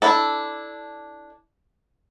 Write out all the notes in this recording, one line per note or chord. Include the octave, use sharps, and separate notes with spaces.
D4 E4 A4